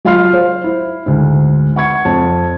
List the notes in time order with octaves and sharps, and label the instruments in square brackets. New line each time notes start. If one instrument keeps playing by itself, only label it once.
[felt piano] F#3 F4 F5 C6 F6 C7
C5
E4
D2 G#2
F#5 C#6 G#6 C#7
F2 A5